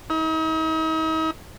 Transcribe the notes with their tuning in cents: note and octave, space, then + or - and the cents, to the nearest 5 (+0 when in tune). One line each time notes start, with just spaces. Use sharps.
D#4 +40